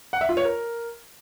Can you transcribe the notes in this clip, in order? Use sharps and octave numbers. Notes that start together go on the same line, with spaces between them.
F#5
E5
F4
C#5
A#4